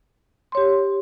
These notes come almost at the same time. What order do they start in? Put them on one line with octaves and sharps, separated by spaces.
C6 C#5 G4